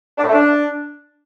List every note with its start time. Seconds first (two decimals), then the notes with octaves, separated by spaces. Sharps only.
0.18 D4
0.23 A2
0.28 A3
0.33 D4